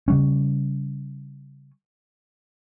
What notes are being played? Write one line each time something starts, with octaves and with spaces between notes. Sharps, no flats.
C#3 G3 C#4